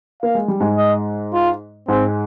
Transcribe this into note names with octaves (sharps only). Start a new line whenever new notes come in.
A#3 F5
G#3
G3
G#2 G#3
D#5
F4
G#2 G#3 C4